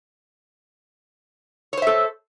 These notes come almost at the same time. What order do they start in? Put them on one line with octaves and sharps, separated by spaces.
C#5 C5 E5 A4